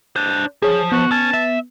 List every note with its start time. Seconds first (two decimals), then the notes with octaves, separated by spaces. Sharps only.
0.16 D4 C5
0.62 F3 G#4 C#5
0.92 B3 F#4
1.11 C#4 A5
1.33 E5